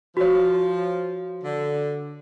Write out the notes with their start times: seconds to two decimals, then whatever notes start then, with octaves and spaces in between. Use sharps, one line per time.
0.17 F3 F#4 C#5
1.44 D3